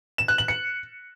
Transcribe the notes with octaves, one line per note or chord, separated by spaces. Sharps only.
E7
F#6
F#7
C#7